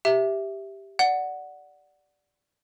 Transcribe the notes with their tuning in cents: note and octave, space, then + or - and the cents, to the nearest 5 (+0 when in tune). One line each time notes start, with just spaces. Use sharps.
G4 +0 E5 +0
D5 -5 F#5 +0